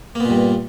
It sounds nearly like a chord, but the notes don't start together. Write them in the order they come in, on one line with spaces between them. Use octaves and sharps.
A#3 B3 A#2 G2